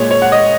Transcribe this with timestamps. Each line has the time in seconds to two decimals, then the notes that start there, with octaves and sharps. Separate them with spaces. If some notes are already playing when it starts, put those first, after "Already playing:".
Already playing: A#2 G#3 C#5
0.11 C#5
0.22 F#5
0.32 D#5